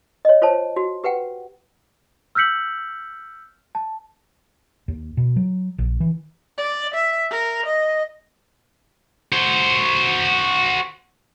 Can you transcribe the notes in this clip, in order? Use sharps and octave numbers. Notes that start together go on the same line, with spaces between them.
C#5 D#5
F4 C5 C#5 A5
F#4
G4 B4 F#5 G5
E6 F6 G6 B6 C#7 F#7
A5
D#2
B2
F#3
A#1
E3
D5
E5
A#4
D#5
F#4 C5